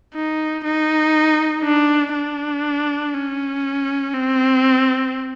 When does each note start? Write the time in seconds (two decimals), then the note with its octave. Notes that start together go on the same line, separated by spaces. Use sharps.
0.15 D#4
0.64 D#4
1.64 D4
2.14 D4
3.14 C#4
4.14 C4